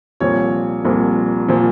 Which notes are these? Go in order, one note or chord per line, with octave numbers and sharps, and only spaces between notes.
C2 A#2 F3 C#5
C2 A#2 F3
A#2 F3